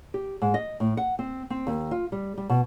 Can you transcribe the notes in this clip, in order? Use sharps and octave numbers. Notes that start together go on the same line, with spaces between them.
G4
G#2
D#5
A2
F#5
C4
C4
D#2
F4
G3
G3
B2